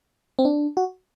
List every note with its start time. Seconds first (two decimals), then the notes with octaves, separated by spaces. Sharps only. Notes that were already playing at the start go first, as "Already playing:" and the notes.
0.39 C4
0.45 D4
0.77 F#4